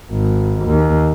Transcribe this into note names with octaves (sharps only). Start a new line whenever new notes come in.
G#1
D#2